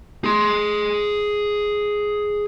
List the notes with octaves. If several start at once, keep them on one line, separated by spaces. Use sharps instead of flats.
G#4 C6